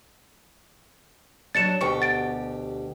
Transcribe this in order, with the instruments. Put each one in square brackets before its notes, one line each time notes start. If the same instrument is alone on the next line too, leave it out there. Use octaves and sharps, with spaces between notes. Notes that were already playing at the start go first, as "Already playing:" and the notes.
[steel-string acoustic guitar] F#3 G3 D4 [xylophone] A6 C#7 E7
[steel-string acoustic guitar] D2 B2 G4 [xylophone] C#6 C#7
[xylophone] F#5 A6 D7